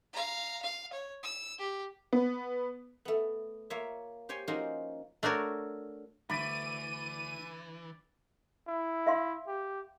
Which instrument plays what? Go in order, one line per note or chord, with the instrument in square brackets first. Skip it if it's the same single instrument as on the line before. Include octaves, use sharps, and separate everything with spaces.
[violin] F5 A#5
F5
C#5
E6
G4
[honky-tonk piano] B3
[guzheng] A3 B3
A#3 F4 C#5 E5
G4 C5 C#5 G5 G#5
F3 A#3 C#4 D#4 F#4 C5
[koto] A3 D4 F#4 A#4 C#5
[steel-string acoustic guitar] D2 [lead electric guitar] E3 [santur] D5 B5 [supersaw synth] D#7
[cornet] E4
[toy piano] E5 F5 C6
[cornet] G4